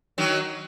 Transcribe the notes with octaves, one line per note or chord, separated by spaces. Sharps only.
D#3 F#3